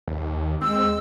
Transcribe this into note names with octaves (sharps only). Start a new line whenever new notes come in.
D#2
G#3 C4 E6